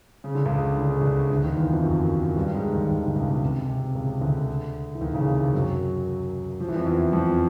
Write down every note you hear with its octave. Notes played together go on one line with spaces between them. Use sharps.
C#3
D3
C#2 C#3
D3
C#3
D2 D3
D2 D3
D#2 D#3
E2 E3
F2 F3
F#2 F#3
G2 G3
G#2 G#3
D3
D#2 D#3
D#2 D#3
D2 D3
C#2 C#3
B2
C3
C3
C#2 C#3
D2 D3
E3
D#2 D#3
C#2 C#3
C3
C3
F#2 F#3
F3
E3
F2 F3
E2 E3
F2 F3